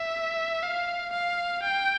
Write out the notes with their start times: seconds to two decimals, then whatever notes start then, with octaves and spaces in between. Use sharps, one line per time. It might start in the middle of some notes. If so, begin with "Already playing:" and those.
Already playing: E5
0.63 F5
1.13 F5
1.63 G5